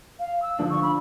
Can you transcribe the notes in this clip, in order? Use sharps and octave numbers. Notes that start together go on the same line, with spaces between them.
F5
E6
D3 F3 D4
C#6
B5